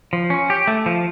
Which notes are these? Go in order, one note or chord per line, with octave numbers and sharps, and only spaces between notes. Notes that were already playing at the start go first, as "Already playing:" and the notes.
F3
C#4
G4
A3
F3